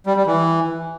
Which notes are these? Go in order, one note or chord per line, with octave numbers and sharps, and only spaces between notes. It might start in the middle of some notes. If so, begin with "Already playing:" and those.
G3
G3
E3